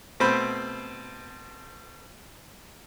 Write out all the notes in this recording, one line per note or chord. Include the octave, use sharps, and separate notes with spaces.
B2 A3 C4 C5 B5